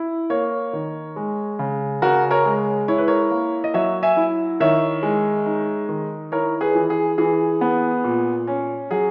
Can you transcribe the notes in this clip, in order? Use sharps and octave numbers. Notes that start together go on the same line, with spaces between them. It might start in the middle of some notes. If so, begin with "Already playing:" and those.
Already playing: E4
A#3 A#4 C#5
D#3
G#3
C#3
C#3 F#4 A#4
A#4 C#5
G#3
E4 C#5
B4
A#4 C#5
A#3
D#5
F#3 C#5 E5
E5 G#5
E4
D#3 C#5 E5
G#3
D#4
D#3
E4 A#4 C#5
G#4 B4
E3
G#4
E3 G#4
B3
A#2
C#4
F#3 G#4